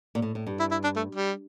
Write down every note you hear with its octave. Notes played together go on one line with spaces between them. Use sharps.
A#2
A2
A2
G2
E4
E4
D4
A3
G3